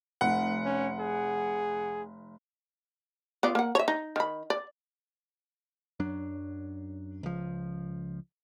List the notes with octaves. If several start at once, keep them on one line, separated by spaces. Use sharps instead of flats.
F1 F#5
C#4
G#4
B3 F4 D5
A#3 F#5
C#5 E5
D#4
D#3 B5
D5
F#2 F#3 D4
C#2 F3